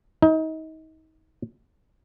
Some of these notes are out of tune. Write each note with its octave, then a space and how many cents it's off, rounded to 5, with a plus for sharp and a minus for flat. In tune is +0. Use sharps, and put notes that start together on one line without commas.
D#4 +30